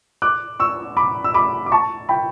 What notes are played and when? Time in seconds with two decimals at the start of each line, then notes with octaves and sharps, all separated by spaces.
0.22 D6 F#6
0.60 C#6 E6
0.97 B5 D6
1.24 E6
1.34 B5 D6
1.66 D6
1.72 A5 C#6
2.09 G5 B5